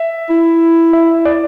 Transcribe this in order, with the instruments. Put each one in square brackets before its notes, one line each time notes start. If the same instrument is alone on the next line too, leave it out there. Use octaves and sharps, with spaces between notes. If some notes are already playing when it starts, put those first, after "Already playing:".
Already playing: [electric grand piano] E5
[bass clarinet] E4
[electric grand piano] E5
D5